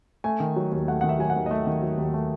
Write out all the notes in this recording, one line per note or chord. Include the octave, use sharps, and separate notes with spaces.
A3 G#5
D#3
F#3
D#2
A3 F#5
D#3 F#5
E5
F#3 G#5
F#5
D#2
D#5
A3 E5
D#3
F#3
D#2
A3